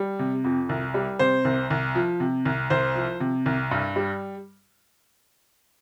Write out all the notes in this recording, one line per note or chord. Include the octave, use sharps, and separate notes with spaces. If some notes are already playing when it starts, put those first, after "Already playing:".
Already playing: G3
C3
F2
C2
G3
C3 C5
C2
C2
F3
C3
C2
C2 C5
F3
C3
C2
G2
G3